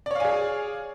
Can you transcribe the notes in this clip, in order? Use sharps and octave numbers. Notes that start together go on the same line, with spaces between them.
G#4 C#5 D5 F5 G#5